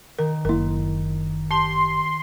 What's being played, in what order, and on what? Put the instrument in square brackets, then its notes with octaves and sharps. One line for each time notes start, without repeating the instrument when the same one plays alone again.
[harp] D#3 [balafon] A#4
[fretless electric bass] F#1 A#3 [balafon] E4 A#4
[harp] G4 [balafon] A5 [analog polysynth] C6